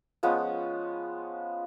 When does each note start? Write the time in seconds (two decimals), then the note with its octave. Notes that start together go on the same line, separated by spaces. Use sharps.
0.23 F3 G#3 B3 C#4